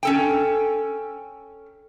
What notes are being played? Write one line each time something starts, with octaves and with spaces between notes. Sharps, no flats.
C#4 A4 G5